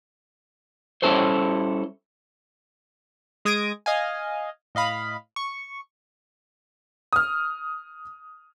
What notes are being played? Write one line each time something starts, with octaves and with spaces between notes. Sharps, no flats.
G3 C#4 E4 A4 C5 C#5
G#3 D#6 G#6 A#6 D7
D#5 F5 G#5
A2 D#5 F5 B5
C#6
D#6 F6